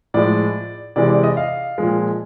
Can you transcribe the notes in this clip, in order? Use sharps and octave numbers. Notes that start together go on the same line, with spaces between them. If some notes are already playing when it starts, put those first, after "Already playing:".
A2 F3 G#3 D5
C3 E3 G#3 D5
D5
D#5
F5
A#2 F3 G#3